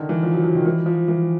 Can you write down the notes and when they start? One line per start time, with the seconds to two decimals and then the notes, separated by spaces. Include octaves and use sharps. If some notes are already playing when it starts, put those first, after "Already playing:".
Already playing: D3 D#3
0.09 E3
0.23 F3
0.33 F#3
0.44 F3
0.55 D#3
0.66 E3
0.86 F3
1.08 E3